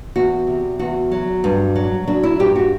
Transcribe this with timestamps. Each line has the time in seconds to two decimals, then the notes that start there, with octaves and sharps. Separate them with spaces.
0.16 E2 F#4
0.48 C3
0.79 E2 F#4
1.12 F#3
1.44 G2
1.76 F#3
2.08 F#3 D4
2.23 E4
2.39 G2 G4
2.56 F#4